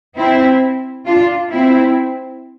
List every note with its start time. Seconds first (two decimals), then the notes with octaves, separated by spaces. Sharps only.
0.16 C4 E4
1.06 D4 F4
1.51 C4 E4